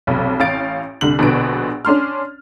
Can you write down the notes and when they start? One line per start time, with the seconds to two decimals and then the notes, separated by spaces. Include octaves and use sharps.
0.07 F1 B1
0.40 A1 F5 A6 D7
1.01 C2 D3 F#7
1.19 A#1 B2 D3 D4 B4 D7
1.85 C#4 D4 C6 F6